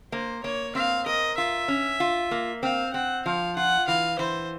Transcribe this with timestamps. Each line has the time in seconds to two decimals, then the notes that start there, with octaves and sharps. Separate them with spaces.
0.12 A#3 C5
0.44 A#3 C#5
0.75 C4 F5
1.06 A#4 D#5
1.38 F4 E5
1.68 C#4
2.00 F4
2.31 A#3
2.63 C4 F5
2.94 C4 F#5
3.25 F3 F5
3.56 F4 F#5
3.88 E3 F5
4.19 E3 C5